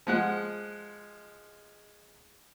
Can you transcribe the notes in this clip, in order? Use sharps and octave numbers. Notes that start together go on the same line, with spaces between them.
F3 G#3 F#5